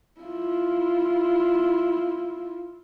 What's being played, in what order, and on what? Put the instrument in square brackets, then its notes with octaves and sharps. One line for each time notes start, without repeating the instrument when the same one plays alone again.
[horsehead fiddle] E4 F4